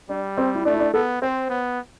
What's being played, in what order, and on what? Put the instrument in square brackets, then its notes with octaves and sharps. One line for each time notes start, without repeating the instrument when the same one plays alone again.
[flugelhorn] G3 [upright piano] D4
[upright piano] C4
E4
[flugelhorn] A3 [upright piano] D4
[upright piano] E4
D4
[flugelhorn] B3 [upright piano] A4
[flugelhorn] C4 [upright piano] C5
[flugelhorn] B3